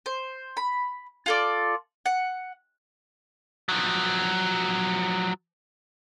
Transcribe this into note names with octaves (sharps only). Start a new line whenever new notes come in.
C5
B5
F4 A4 D5
F#5
F3 F#3